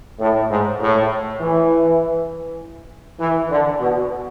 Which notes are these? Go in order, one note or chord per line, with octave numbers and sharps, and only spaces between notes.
A2
G#2
A2
E3
E3
D3
B2